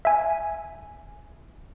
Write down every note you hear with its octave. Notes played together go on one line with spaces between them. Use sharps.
E5 G#5